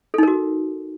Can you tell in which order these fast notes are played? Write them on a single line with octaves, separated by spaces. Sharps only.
A4 D#4 A#4 F#4